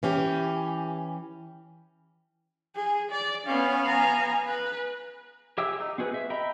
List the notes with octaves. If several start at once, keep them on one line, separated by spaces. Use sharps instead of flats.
E3 C#4 G4
G#4
D5
B3 C#4 F5
G#5 A#5
B4
G4 G#4 E5 G5 E6
D#4
C4 F#4 G#4 B4
E5
D#5 E5 G5 A#5 B5